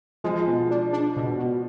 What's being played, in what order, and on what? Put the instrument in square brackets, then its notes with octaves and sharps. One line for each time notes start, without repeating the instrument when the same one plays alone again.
[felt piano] F3 [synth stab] G#3
[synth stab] B2
D4
D4
B2
B2